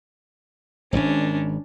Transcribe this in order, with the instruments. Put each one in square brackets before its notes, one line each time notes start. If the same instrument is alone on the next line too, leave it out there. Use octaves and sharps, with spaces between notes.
[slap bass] D#1 G#1 [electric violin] C#4 D4